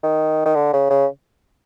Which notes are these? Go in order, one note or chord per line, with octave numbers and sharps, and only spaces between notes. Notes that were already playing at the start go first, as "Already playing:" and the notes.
D#3
D#3
D3
C#3
C#3